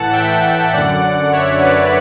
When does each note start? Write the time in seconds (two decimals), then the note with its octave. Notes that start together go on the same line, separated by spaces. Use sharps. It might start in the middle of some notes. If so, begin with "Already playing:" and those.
Already playing: A2 E3 F#5 A5
0.13 E5 G5
0.73 F#2 D3 D5 F#5
1.32 C#5 E5
1.62 B4 D5